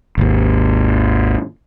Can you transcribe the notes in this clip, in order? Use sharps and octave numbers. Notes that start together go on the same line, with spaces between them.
G#1 D#2